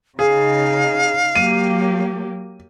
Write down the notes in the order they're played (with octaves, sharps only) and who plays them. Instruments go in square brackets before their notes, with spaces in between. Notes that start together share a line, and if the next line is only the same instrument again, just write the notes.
[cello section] C#3 D#4 [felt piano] G#4 [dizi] F5
[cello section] F#3 A#3 G4 [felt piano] D#7